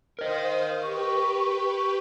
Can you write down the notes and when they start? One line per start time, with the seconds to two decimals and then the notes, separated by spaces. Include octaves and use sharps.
0.19 A#4 C5 D#5 F5 D#6
0.83 G4 B4 C#6